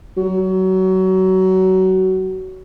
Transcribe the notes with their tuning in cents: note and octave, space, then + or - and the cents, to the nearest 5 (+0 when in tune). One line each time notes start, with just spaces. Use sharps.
F#3 +25